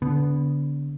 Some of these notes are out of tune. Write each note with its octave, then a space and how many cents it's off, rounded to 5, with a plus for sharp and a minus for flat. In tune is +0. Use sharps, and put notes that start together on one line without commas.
D3 -30 B3 +0